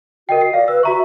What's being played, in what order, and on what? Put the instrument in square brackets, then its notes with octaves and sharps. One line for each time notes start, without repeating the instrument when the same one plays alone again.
[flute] F#4 [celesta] A#4 D#5 G5
[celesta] C7
[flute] D5 [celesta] F5
[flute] B4 [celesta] E6
[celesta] F#4 A#5 C#6 [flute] E5